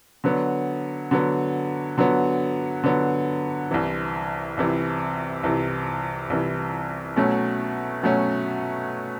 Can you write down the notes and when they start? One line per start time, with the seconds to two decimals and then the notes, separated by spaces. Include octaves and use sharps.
0.24 D3 F#3 B3
1.11 D3 F#3 B3
1.98 D3 F#3 B3
2.84 D3 F#3 B3
3.71 C2 C3 E3
4.57 C2 C3 E3
5.43 C2 C3 E3
6.30 C2 C3 E3
7.16 B2 F#3 A3 C#4
8.03 B2 F#3 A3 C#4